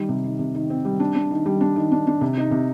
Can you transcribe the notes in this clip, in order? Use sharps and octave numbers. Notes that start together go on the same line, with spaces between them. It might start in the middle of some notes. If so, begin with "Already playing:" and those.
Already playing: D#3 G3
C3
D#3
C3
D#3
C4
G3
D4
D4
D#3
G3
D4
D#3
D4
D4
C3
D#4
C3